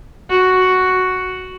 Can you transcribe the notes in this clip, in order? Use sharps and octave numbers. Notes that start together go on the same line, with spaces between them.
F#4